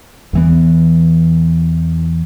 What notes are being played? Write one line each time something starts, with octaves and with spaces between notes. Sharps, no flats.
E2 E3 B3